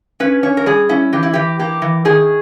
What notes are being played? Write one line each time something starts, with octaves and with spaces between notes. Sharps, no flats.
C#4 B4
C#4 C#5
A#4
G3 G#4
C#4 E4
E3 G4
E4
E3 G4
A#3 G4
E3
D#3 G#4